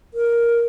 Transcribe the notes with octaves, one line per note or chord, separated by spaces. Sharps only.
A#4